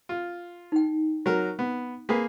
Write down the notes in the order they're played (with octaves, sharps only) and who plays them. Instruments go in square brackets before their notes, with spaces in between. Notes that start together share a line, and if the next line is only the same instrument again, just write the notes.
[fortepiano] F4
[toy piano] D#4 G5
[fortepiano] F#3 A#4
B3
A#3 G#4 B4